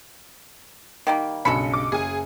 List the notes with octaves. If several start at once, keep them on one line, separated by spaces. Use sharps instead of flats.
D#3 G3 A#3 G5
B1 G2 C#3 G#3 A4 B5 C#7
D6
F#1 G#4 G#5